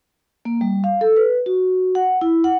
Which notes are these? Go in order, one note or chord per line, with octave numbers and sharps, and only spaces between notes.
A#3
G3
F5
A4
B4
F#4
F#5
E4
F#5